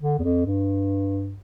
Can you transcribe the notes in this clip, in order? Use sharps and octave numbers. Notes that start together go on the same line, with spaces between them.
D3
E2
F2
G2